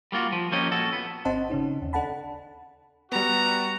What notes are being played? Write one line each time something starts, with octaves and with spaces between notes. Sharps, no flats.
G3 A#3 F4 F#4
F3
F3 A#3 C#4 G4 C#5 D#5
A#2 F#4 A4
B3
G#1 C4 C5 D#5 F#5 A5
C#3 C#4 D#4
D#2
D4 A4 F#5 A5 B5
G3 B3 F#4 A#5